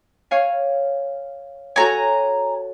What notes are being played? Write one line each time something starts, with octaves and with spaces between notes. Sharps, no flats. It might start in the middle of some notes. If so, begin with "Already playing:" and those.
C#5 F5 G#5
F#4 A4 C#5 G#5 A#5